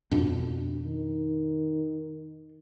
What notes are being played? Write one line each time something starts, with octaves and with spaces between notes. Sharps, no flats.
F2 B2 D4
D#3